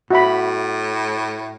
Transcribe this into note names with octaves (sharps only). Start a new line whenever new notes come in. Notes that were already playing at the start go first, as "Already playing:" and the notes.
A2 F#4 E5 B5